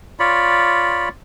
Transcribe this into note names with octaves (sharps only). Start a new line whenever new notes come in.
F4 C#5 D5 B5